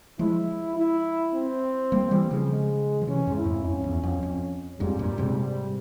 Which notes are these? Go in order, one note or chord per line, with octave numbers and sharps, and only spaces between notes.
F3 G#3 E4
E4
C4
G3 A#3
E3 G3
C#3 F3
G#3
F3
C3 E3 C#4
F2 G#2
E4
F2 G#2
F2 C#4
E2
F2
F2
F2 G#2 G3
G2 A#2
G#2 C3
G3